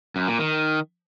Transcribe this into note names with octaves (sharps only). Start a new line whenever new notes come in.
F#2
A#2
D#3